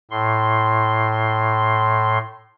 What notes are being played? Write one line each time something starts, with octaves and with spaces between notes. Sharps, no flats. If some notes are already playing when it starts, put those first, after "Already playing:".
A2 C6